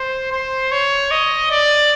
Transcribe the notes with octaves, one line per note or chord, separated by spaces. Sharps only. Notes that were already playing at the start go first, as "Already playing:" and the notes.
Already playing: C5
C5
C#5
D#5
D5